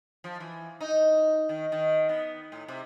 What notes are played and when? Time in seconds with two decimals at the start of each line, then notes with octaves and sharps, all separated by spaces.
0.24 F3
0.40 E3
0.81 D#4
1.49 D#3
1.72 D#3
2.09 B3
2.52 A2
2.68 C3